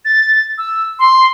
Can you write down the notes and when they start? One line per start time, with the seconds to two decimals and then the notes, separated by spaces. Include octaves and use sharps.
0.05 A6
0.58 E6
0.99 C6